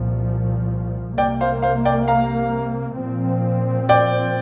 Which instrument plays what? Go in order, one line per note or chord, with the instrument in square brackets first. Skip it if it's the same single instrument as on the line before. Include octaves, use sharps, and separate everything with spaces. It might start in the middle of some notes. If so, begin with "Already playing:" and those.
Already playing: [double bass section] C2 A#2 F3
[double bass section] C2 C3 A#3 [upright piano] D5 G5
[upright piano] C5 F5
C5 F5
D5 G5
F5 A#5
[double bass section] A#2 F3 C4
[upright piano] D5 G5